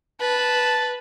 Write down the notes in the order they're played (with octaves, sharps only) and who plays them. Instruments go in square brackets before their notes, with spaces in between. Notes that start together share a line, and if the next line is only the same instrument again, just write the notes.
[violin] B4 [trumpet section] A5